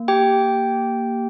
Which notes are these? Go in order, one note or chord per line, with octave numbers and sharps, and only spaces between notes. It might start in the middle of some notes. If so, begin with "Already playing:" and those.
Already playing: A#3
G4 G5